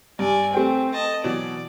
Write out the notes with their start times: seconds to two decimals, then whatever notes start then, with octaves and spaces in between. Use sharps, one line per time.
0.19 G2 D5 G#5
0.53 A3 C4 G5
0.94 D#5 A5
1.24 B2 E3 F#3 D5